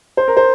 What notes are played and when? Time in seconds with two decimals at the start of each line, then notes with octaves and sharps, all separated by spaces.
0.17 C5
0.28 A#4
0.37 C5